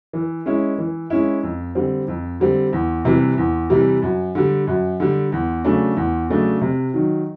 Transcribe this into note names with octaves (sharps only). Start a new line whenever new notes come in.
E3
G#3 C#4 E4
E3
G#3 C#4 E4
F2
D3 G3 C4
F2
D3 G3 C4
E2
C3 E3 G3
E2
C3 E3 G3
F#2
D3 G3
F#2
D3 G3
E2
C#3 F#3 A3 D4
E2
C#3 F#3 A3 D4
C3
D#3 F#3